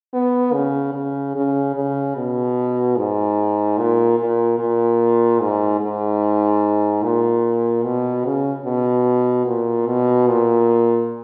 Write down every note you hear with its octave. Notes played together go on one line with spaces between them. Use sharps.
B3
C#3
C#3
C#3
C#3
B2
G#2
A#2
A#2
A#2
G#2
G#2
A#2
B2
C#3
B2
A#2
B2
A#2